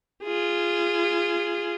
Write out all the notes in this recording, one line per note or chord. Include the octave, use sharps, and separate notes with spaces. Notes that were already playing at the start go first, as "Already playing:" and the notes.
F4 G#4